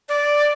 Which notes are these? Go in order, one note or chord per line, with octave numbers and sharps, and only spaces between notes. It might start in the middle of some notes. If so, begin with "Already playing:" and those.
D5